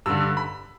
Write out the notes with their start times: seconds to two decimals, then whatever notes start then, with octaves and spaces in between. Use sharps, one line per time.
0.06 G2 D3 E6
0.37 B5